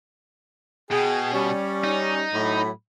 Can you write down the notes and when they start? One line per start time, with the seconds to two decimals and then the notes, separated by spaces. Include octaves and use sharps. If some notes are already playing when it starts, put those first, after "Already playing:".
0.91 B2 G#4 G5
1.32 G3 C#4 D5
1.84 D#4
2.33 A2 F#3 B5